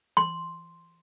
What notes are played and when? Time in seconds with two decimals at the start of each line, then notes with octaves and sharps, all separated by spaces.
0.17 C6